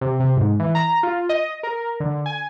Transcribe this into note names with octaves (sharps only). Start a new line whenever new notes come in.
C3
C3
G#2
E3
A#5
F4
D#5
A#4
D3
G#5